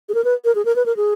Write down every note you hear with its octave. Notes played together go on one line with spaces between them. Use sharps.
G#4
A#4
B4
A#4
G#4
A#4
B4
A#4
G#4